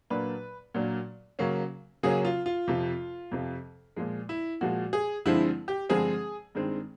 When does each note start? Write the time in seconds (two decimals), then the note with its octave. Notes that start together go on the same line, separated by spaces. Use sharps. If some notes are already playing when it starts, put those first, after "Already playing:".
0.10 A#2 F#3 A#3 D4 B4
0.74 A#2 F#3 A#3 D4
1.39 C#3 F#3 A#3 C#4
2.03 C#3 F#3 A#3 C#4 G#4
2.25 F4
2.46 F4
2.68 F2 C3 F3
3.31 F2 C3 F3
3.96 A#2 F3 G#3
4.29 E4
4.61 A#2 F3 G#3 F#4
4.93 G#4
5.25 G2 D3 F3 G#3 C4 E4
5.68 G4
5.89 G2 D3 F3 G#3 C4 G#4
6.55 G2 D#3 G#3 C4